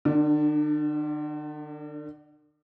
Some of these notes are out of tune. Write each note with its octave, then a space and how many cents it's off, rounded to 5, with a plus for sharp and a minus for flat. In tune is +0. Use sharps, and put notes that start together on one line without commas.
D3 +45 D4 +0